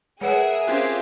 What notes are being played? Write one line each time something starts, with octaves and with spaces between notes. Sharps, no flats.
G#3 G#4 A#4 B4 C#5 E5 F#5
C4 C#4 F4 G4 F#6 G#6 C7